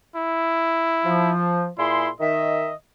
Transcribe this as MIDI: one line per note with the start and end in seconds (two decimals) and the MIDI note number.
0.16 1.32 64
1.05 1.68 53
1.78 2.09 46
1.78 2.09 64
1.78 2.09 68
1.78 2.09 84
2.20 2.71 51
2.20 2.75 75
2.20 2.71 76